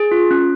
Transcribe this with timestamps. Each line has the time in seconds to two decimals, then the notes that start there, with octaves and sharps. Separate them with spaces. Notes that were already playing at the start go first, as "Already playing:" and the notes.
Already playing: G#4
0.12 F4
0.31 C#4